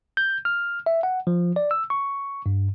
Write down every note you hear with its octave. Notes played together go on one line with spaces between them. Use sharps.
G6
F6
E5
F#5
F3
D5
E6
C#6
G2